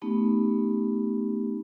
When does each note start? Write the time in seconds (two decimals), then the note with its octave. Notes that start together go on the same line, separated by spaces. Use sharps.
0.02 A3 B3 C#4 D#4 G4